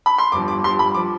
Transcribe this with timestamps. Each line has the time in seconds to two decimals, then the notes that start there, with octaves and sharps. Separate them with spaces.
0.06 B5
0.18 C6
0.32 G1 G2 F3 D6
0.48 D6
0.64 G1 G2 F3 C6
0.79 B5
0.95 F3 D6